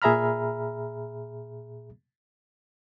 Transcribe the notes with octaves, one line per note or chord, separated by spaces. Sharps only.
A#2 G#4 E5 A#5 B5 F6